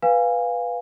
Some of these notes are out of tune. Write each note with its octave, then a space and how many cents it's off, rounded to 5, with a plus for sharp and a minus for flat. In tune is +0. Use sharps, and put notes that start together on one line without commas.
B4 +0 F5 +5 G#5 -25